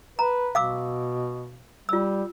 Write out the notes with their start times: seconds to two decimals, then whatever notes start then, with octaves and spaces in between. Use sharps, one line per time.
0.19 B4 A#5
0.55 B2 F5 D6 E6
1.89 G3 F4 E6